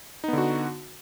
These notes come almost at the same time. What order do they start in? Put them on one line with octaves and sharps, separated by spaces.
D#4 B3 D3 F#4